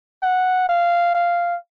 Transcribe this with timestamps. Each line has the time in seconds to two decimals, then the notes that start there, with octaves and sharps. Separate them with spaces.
0.23 F#5
0.69 F5
1.15 F5